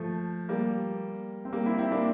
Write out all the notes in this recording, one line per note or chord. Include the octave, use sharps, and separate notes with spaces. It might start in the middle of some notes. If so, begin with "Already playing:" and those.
Already playing: F3 A3
G3 A#3
C4
G3 A#3
C4 E4
C4 E4
A#3 D4